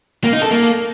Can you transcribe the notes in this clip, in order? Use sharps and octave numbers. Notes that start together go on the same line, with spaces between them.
A#3
D#4
A4
A#3